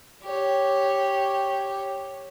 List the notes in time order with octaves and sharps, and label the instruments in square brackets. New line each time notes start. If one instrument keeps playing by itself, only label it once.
[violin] G4 C#5